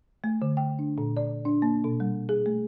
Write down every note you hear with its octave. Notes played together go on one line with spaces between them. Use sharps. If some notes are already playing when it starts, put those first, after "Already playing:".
A3
D3
G5
D4
A#2
D5
D4
A#3
B2
G3
G#4
A3